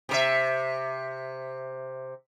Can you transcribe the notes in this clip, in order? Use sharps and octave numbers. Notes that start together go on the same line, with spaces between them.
C3 A#4 E5